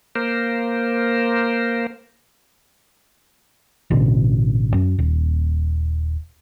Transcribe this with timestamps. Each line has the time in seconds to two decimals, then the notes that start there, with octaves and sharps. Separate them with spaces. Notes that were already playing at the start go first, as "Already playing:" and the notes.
0.16 A#3 A#4 C5
3.91 A1 B2 D3
4.74 F#2
4.99 D#1